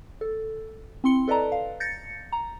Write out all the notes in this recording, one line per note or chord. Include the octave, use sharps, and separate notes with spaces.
A4
C4 E4 C6 C#7 G7
A4 B4 D5 D#5 A5 A#5
F5
G6 A6 A#6 C#7
A#5